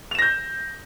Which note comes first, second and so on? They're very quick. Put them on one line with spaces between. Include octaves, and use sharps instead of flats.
F7 E7 A#6 G6